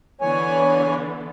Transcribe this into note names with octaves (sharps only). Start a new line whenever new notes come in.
D3 E3 B3 C#5 G#5